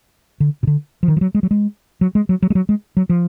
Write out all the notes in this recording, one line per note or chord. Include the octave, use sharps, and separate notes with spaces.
D3
B2
D3
F3
D#3
F3
F#3
G#3
F#3
G#3
F#3
G#3
F#3
F#3
G#3
F#3
G#3
F#3
F3